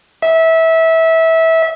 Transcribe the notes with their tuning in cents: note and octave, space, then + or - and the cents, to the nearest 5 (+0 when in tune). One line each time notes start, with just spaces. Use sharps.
E5 -20